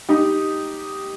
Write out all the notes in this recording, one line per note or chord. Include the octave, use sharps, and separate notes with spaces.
D#4 G4